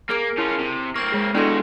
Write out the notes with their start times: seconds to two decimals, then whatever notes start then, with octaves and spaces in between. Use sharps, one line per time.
0.10 A#3 G#4 A#4 D7
0.38 C#4 E4 F4
0.60 C3
0.96 A#3 C4 C#6 F6 G#6
1.12 G#3 G#4
1.35 G#3 B3 D4 E4 F#4 A4 D5 C6